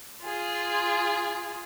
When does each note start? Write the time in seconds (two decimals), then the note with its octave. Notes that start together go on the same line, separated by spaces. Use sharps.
0.24 F4 G#4